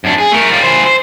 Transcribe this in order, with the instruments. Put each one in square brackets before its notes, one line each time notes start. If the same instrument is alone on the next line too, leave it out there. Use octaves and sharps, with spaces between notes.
[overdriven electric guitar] F#2 D4
G#4
A3 A#4
G3 F4
E3 C5
C5